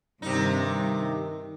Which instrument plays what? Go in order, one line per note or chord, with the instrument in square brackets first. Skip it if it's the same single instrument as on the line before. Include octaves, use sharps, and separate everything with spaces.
[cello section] G2 [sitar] C3 D#4 [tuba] D#3